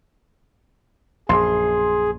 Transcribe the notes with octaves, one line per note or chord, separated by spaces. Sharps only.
A#1 F#2 G#4 C6